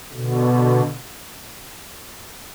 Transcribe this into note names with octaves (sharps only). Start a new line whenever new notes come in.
B2 D3